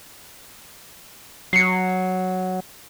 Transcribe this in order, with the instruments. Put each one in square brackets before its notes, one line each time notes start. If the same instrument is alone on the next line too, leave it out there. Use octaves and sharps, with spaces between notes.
[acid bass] F#3 [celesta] C7 C#7